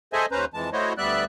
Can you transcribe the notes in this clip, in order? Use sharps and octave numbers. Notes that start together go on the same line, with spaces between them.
G#4 A4 C5 D#5 E5 G#5
D#2 C#4 B4 C5 A#5
F2 E3 G#3 A5
A3 E4 F#4 C5 C#5 D#5
D2 G3 B3 D5 E5 F#6